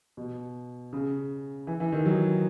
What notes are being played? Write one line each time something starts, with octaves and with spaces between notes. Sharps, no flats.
B2
C#3
E3
E3
D#3
F#3